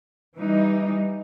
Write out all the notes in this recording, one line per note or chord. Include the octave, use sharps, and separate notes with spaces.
E3 G3 D#4